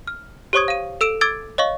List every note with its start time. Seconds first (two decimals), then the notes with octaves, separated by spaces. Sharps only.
0.07 F6
0.53 G4 C5 C#5 C#6 D#6 G#6
0.68 F5 D#7
1.01 A4 E6 D7 E7
1.21 D6 E6 G#6 A6 D7
1.58 C#5 D#5 F5 C#6